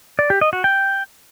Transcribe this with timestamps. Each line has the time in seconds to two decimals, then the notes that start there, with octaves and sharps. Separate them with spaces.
0.19 D5
0.30 G4
0.41 D#5
0.53 F#4
0.64 G5